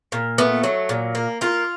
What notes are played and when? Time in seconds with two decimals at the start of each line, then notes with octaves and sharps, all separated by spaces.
0.12 A#2
0.38 A3 B3
0.63 F#3
0.89 A#2
1.15 A#3
1.41 A#3 F4